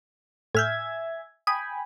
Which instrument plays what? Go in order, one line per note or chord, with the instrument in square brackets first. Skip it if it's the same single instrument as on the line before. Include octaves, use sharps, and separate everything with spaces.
[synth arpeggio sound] A2 F6 G6 [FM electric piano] E5 G#5 G#6
[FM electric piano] G5 G#5 B5 [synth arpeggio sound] D#6